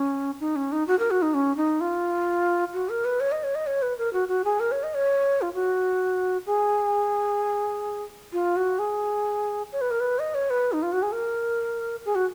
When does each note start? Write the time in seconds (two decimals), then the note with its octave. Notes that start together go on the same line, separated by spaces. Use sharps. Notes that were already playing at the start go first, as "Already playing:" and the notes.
Already playing: C#4
0.40 D#4
0.56 C#4
0.72 D#4
0.87 F#4
0.99 A#4
1.11 F#4
1.22 D#4
1.34 C#4
1.57 D#4
1.81 F4
2.74 F#4
2.89 A#4
3.05 B4
3.20 C#5
3.32 D#5
3.43 C#5
3.55 D#5
3.67 C#5
3.82 B4
3.98 A#4
4.13 F#4
4.28 F#4
4.45 G#4
4.60 A#4
4.72 C#5
4.83 D#5
4.94 C#5
5.42 F4
5.54 F#4
6.46 G#4
8.33 F4
8.56 F#4
8.79 G#4
9.72 C#5
9.81 B4
9.91 A#4
10.00 B4
10.19 D#5
10.35 C#5
10.50 B4
10.72 D#4
10.83 F4
10.93 F#4
11.02 G#4
11.12 A#4
12.05 G#4
12.15 F#4